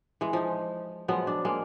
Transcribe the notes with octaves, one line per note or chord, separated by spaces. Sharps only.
E3 G#3
F3 D#4
F3 F#3 G#3 B3
D4
G#3 A#3 F5